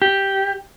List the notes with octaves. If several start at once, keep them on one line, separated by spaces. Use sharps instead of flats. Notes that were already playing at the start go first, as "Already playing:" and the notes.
G4